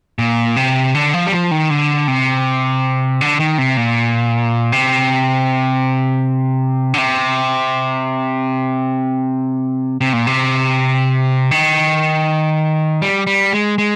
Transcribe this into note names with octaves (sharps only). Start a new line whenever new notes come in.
A#2
C3
D3
F3
G3
F3
D#3
D3
C3
D3
D#3
C3
A#2
C3
D3
C3
C3
A#2
C3
D#3
G3
G3
G#3
G#3